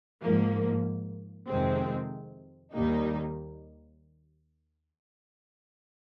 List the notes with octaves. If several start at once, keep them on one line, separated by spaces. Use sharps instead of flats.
G#2 F3 A#3
F2 C3 D#3 G#3 C4
D#2 D#3 G3 A#3 D#4